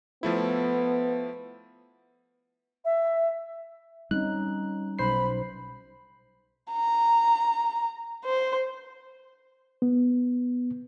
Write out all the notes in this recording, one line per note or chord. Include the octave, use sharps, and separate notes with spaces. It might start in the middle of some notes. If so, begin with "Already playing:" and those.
F3 A3 B3 E4
E5
G3 C4 C#4 D#4 F#6
B1 C5 B5 C7
A#5
C5
B3